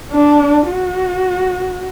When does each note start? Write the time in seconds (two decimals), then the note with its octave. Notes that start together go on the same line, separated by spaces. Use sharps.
0.11 D4
0.68 F#4